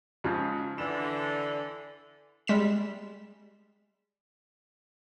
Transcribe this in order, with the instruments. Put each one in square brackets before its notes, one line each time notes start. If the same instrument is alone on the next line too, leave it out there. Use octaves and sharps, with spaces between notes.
[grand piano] G#2 C#3 F3
[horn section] D3 E3 [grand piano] E7
[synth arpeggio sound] G3 G#3 B6 E7